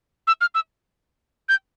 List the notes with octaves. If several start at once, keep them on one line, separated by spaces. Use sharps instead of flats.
E6
F6
E6
G6